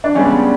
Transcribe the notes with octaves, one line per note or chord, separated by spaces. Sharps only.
D4
C#2 C#3 G3 B3 C#4 D4